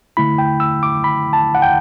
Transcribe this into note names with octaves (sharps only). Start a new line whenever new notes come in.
D3 A3 E4 B5
G5
E6
D6
B5
A5
F#5
G5